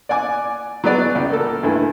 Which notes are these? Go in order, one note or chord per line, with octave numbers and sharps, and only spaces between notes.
D5 F#5 G#5 D6
F#3 B3 G#4 D5 F#5
C#2
A#3 A4
G2 A3 E4 G#5